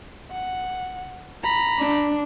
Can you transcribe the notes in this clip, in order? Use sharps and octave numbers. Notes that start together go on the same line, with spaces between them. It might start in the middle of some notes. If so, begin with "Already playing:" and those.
F#5
A#5 B5
D4